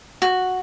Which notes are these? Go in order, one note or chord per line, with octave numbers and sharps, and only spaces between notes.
F#4